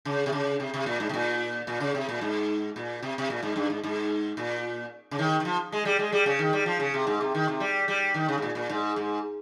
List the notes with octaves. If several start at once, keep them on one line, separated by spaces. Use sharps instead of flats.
C#3
C3
C#3
C3
C3
A#2
G#2
C3
A#2
A#2
C#3
C3
A#2
G#2
A#2
C3
C3
A#2
G#2
G2
G#2
G#2
A#2
C#3
D#3
D#3
F3
G#3
G3
G#3
G3
C#3
D#3
G3
F3
C#3
C3
G#2
C3
D#3
C3
G3
G3
D#3
C#3
G#2
A#2
A#2
G#2
G#2